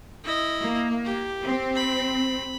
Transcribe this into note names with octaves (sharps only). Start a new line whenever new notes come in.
E4 D#5
A#3
G4
C4
B5